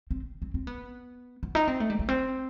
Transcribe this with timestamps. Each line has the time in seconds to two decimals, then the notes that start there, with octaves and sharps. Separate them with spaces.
0.11 C4
0.42 C4
0.54 C4
0.67 B3
1.43 B3
1.55 D#4
1.68 C4
1.80 A3
1.90 G3
1.99 A3
2.09 C4